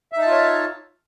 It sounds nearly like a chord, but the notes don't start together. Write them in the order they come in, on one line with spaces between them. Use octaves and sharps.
E5 D#4 A5 F4 C#5